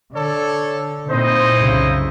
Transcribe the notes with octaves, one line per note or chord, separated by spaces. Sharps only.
D3 A4 C#5 D5
A#2 C4 D#4 E4 C5 D#5
C2 F#2 C#3